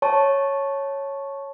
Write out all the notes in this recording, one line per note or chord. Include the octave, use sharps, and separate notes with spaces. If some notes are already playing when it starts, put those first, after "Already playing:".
C#5 A5 C#6